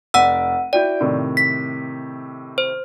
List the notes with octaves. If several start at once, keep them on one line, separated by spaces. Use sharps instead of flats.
F1 D5 F#5 E6 D#7
E4 F#4 D5 G5
A2 C3 D#3
B6
C5